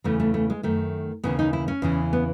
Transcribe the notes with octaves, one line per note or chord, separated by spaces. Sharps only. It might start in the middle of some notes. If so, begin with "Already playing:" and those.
E2 C#3 E3 A3
A3
A3
G#3
F#2 D#3 A3
D#2 C#3 E3 B3
D#4
E4
C#4
E2 C#3 E3
B3